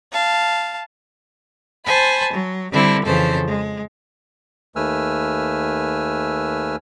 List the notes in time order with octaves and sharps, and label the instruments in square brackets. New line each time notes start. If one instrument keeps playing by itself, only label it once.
[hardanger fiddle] F5 A5
[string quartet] C5 G#5 A5 B5
F#3
D3 G3 C4 E4 A4
F2 C#3 E3 A4 C5
G#3
[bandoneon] D#2 A3 B4 G#5 E6 F6